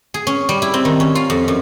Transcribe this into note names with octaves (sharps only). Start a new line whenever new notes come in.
G#4
C#4
G3
E4
C4
D#3
C#4
F4
F2
F#2